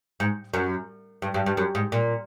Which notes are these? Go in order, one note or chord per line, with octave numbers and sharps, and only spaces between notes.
G#2
F#2
G2
G2
G2
F#2
G#2
A#2